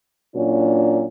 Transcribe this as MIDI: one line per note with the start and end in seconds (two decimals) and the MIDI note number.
0.36 1.06 46
0.36 1.06 54
0.36 1.06 61
0.36 1.06 62